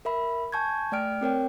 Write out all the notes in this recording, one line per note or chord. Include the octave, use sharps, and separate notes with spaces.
A#4 E5 B5
G#5 A5 C#6 G6 G#6
A3 D5 G5 F6 D7
C4 A#4 C#5 G5